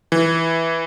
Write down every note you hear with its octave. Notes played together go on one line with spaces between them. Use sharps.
E3